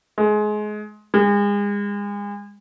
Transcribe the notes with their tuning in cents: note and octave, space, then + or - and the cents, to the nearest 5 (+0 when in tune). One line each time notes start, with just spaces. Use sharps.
G#3 +25
G#3 -35